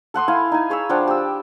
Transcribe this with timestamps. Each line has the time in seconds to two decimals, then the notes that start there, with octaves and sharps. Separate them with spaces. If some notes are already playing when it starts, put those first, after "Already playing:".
0.14 A4 F#5 C6 D#6
0.28 E4 F5 G#5
0.52 D#4 G#5
0.70 G#4 C#5 B5 E6
0.89 F3 D4 F#5 G5
1.07 G4 E6